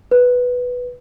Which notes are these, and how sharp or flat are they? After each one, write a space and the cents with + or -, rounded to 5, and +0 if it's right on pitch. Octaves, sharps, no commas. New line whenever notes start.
B4 +0